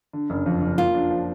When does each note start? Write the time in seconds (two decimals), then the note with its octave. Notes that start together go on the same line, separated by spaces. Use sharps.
0.13 D3
0.30 F#1
0.46 F2
0.62 F#1
0.78 A#3 F4
0.95 D4
1.10 F3